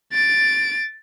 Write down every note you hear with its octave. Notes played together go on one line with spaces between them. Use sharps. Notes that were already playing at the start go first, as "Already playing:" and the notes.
A6 D7